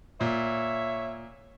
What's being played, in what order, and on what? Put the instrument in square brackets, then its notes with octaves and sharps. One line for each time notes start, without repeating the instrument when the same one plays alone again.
[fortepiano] A#2 [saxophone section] C#5 E5